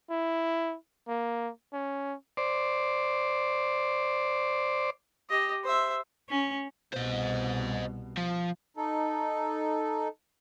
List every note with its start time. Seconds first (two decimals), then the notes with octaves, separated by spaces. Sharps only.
0.10 E4
1.08 A#3
1.73 C#4
2.37 C5 D5
5.30 G4 D#5
5.64 C5 E5
6.29 C#4
6.94 C2 B2 C5 D#5
8.18 F3
8.77 D#4 A4